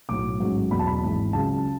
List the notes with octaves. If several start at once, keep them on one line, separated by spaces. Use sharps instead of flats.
B1 A2 F#3 D6
A1 G#2 F#3
E2 B2 F#3 B5
A5
B5
G#1 G#2 E3
C#2 C#3 F#3 A5